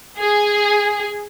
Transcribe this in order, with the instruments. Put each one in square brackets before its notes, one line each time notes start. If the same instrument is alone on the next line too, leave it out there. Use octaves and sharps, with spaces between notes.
[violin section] G#4